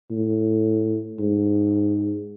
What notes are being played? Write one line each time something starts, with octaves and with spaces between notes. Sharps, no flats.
A2
G#2